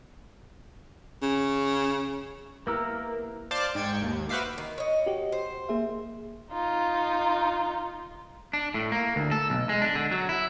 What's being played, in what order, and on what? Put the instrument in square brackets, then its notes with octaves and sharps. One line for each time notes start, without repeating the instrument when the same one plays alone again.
[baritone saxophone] C#3
[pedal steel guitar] A#3 E6 [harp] B3 E4 G4 [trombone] A#4
[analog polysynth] C5 D5 F5 A5 D6
G#2 G5 G#6 C#7
D#2
F#4 B4 C5 E5 F5 D6
[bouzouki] D#3
C#5 D#5
[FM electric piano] F#4 G4
[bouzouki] C5
[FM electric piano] A#3 G#4 E5
[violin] D#4 F4
[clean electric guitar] D4
A2
A#3
D2
A4
B1
G#3
D4
D3
F#3
E4